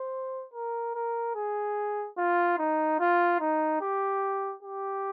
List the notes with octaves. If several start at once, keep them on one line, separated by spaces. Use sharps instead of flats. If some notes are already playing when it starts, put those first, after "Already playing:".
Already playing: C5
A#4
A#4
G#4
F4
D#4
F4
D#4
G4
G4